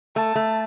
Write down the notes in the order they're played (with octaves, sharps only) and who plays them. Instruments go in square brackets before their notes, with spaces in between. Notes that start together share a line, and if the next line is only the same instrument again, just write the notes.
[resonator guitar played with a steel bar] A3 [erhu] A5
[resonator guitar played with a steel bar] A3